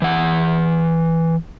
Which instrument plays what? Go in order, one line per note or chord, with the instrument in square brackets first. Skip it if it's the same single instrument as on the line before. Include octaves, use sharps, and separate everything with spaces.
[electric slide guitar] E3 F#5